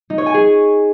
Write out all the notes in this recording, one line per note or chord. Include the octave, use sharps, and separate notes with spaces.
D#4
C#5
G#5
G#4